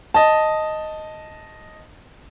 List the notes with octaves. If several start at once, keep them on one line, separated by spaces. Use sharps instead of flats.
D#5 A5